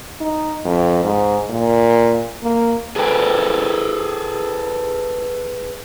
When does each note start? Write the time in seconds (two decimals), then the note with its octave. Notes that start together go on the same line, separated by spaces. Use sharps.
0.21 D#4
0.65 F2
1.04 G#2
1.50 A#2
2.42 A#3
2.96 G#4 A4 B4 G5 G#5